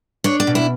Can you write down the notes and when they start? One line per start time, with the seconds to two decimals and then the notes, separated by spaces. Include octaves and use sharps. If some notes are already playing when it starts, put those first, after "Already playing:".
0.24 D4 C#5
0.40 D5
0.47 B2
0.55 E4